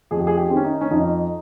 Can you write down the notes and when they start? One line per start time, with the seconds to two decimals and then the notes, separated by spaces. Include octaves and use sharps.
0.11 F2 G#4
0.19 G4
0.27 G#4
0.37 G4
0.50 D#3 C4
0.56 C#4
0.64 D#4
0.81 C#4
0.91 F2 D#4